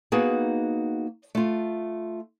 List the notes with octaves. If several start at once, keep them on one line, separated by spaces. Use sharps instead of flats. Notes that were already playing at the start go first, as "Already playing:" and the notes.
A#3 B3 D#4 F#4 G#4
A3 F4